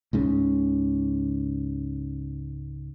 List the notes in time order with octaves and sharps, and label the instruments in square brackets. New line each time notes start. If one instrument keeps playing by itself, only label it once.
[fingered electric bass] C#2 G#2 C#3